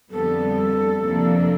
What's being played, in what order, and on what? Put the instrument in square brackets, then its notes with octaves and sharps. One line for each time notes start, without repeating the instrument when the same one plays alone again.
[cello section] F2 D3 G3 B3 [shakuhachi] A4
[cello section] F2 C3 F3 A#3 D4